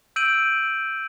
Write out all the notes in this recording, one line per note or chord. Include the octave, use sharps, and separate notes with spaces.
E6 G6 D7 D#7 F#7